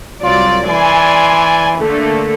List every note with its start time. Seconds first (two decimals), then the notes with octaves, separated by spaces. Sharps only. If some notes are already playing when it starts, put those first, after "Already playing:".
0.24 C2 F#3 F4 D5
0.69 E3 D5 G#5 C6
1.78 D3 A3 A#3